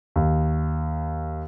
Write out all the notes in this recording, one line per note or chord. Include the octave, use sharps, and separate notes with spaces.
D#2